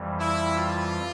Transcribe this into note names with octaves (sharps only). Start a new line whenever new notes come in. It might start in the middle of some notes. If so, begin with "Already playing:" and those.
Already playing: F2 E3 G3
E4
F4